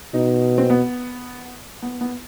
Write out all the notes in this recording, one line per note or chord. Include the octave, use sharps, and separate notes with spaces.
B2 D#4
C4
B3
B3
B3